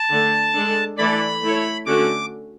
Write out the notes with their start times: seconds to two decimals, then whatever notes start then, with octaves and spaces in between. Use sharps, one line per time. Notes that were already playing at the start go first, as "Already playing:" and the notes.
Already playing: A5
0.10 D3 A3 D4
0.54 G#3 D4 A4
0.98 E3 A3 E4 A4 D5 B5
1.42 A3 E4 A4 C#5
1.86 D3 A3 C#4 F#4 D6